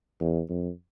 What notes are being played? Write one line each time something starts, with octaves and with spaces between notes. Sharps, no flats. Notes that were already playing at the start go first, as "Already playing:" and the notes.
E2
F2